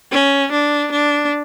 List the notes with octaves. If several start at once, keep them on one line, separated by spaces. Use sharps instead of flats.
C#4
D4
D4